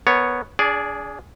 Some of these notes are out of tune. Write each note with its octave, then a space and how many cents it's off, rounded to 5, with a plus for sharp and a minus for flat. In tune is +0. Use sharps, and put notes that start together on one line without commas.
B3 +0 A#4 -25 C#5 +0
D4 -35 G#4 +0 D5 -5